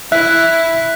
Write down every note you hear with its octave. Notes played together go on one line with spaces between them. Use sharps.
E4 E5 F#6 B6